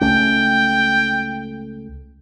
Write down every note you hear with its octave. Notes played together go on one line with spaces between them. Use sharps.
C#2 A3 C#4 G5